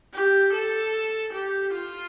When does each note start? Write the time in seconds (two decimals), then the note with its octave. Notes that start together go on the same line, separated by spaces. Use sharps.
0.14 G4
0.53 A4
1.33 G4
1.73 F4